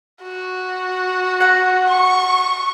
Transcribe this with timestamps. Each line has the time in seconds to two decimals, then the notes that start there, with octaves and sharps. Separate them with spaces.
0.22 F#4
1.40 F#5 A#5
1.89 C#6